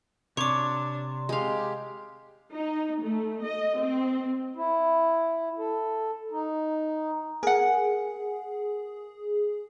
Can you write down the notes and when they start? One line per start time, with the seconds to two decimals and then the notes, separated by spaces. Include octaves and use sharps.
0.37 C3 D4 C#5 C#6 D6
1.29 G#3 G4 F5
2.54 D#4
3.03 A3
3.44 D#5
3.79 C4
4.56 E4
5.58 A4
6.31 D#4
7.43 G#4 A#4 F#5